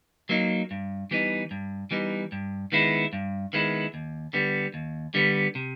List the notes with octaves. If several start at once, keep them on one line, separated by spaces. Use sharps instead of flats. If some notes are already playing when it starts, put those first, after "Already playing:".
F#3 A#3 D#4
G2
E3 G3 B3 D#4
G2
E3 G3 B3 D#4
G2
D#3 G#3 B3 E4
G2
D#3 G#3 B3 E4
D#2
D3 G3 B3
D#2
D3 G3 B3
C3